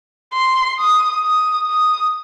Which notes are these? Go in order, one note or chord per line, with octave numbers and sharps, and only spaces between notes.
C6
D#6
D#6
D#6